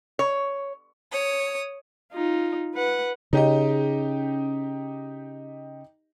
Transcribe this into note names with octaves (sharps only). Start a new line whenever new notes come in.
C#5
C#5 D#6
D#4 F4
B4 F#5
C#3 D#4 G4 D#5